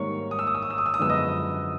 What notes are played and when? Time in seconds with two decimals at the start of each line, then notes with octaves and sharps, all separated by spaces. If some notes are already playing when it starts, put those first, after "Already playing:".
Already playing: G#2 D#3 G3 A#3 C#5 C#6
0.31 D#6
0.39 E6
0.47 D#6
0.55 E6
0.62 D#6
0.70 E6
0.78 D#6
0.86 E6
0.94 D#6
0.99 F#2 D3 F3 G#3 B3 E6
1.09 D#5 D#6